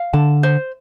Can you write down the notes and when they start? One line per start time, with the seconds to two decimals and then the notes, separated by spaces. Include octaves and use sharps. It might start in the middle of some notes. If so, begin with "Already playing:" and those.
Already playing: F5
0.13 D3 A5
0.43 C5